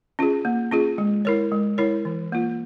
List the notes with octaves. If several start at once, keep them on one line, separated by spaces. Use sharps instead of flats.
C#4 F4 G#4
A#3
C#4 F4 G#4
G#3
E4 A#4 C#5
G#3
E4 A#4 C#5
E3
A#3 F4